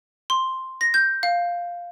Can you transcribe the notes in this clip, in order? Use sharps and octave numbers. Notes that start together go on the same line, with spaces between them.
C6
A#6
G6
F5